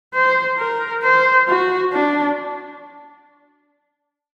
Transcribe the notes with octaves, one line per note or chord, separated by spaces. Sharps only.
C5
A#4
C5
F#4
D4